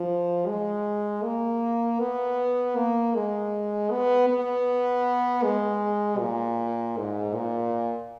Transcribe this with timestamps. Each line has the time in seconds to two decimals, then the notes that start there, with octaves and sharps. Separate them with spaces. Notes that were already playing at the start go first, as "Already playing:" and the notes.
Already playing: F3
0.47 G#3
1.23 A#3
2.00 B3
2.76 A#3
3.15 G#3
3.91 B3
4.28 B3
5.44 G#3
6.19 A#2
6.97 G#2
7.35 A#2